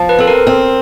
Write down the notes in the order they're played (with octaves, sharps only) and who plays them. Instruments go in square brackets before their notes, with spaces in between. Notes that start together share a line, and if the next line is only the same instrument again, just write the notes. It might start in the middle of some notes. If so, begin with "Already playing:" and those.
Already playing: [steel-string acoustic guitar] F3
[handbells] B4
[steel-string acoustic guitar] C4 [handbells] A4
[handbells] A#4
[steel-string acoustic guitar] C4